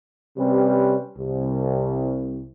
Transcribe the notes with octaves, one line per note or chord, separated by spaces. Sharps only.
C3 G3 C4 C#4 B4
C2